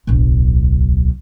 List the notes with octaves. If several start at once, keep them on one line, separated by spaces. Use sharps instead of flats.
D1 B1